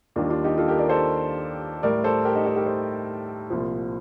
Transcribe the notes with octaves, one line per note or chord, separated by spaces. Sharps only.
D#2 D#3 G3 D4 F4
D4 F4
D#4 G4
F4 A4
G4 A#4
A#4 D5
A4 C5
A2 G3 A#4 D5
A4 C5
G4 A#4
D#4 G4
D#4 G4
G4 A#4
A4 C5
C2 A#2 F3